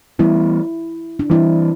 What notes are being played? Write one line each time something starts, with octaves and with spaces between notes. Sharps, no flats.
E3 G3 B3 E4
D4
E3 G3 C4 E4